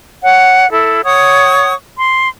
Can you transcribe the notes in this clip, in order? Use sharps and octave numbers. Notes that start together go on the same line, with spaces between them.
C#5 F#5
E4 A4
C#5 F#5 C#6 D#6
C6